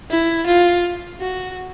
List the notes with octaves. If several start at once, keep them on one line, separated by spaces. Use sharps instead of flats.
E4
F4
F#4